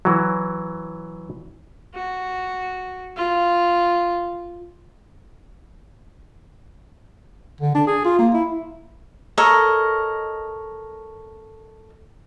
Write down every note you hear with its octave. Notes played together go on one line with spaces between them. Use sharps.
E3 F#3
F#4
F4
D3
D4
G#4
F4
A#3
E4
A4 A#4 C#5 D#5